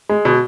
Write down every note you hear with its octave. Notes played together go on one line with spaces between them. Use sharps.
G#3
B2